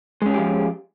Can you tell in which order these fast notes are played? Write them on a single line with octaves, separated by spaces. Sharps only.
G#3 C#4 G#4 G4 F3